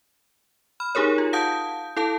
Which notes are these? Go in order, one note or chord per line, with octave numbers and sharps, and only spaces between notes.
B5 F6
D#4 G4 G#4 A#4 C#5
F4
F5 F#5 A5 D#6 G6
E4 A4 F5 A5